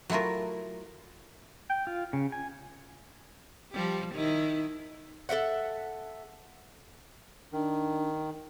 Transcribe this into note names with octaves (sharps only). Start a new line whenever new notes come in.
F#3 A3 E4 F4 A#4
G5
F4
C#3
G#5
F3 G3 G4
D#3 D#4 E4
A4 A#4 E5 F#5
D#3 D4